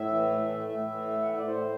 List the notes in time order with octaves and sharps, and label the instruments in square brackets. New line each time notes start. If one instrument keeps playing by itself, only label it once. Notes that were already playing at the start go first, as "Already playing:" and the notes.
Already playing: [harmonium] A2 E5
E3
A3
A2
A2 E5
E3
A3
F#5
A2 E5
D5
A2 C5